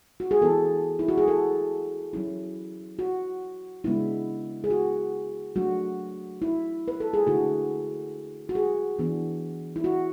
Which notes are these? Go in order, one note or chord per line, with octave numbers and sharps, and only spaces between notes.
F#4
G#4
E3 B3 E4 A4
E4
F#4
G#4
A4
F#3 C#4 E4
F#4
C#3 G#3 B3 D4 E4
G#4
F#4
F#3 A3 D4 F#4
E4
B4
A4
G#4
D3 A3 E4 F#4
F#4
G#4
E3 B3 D4
E4
F#4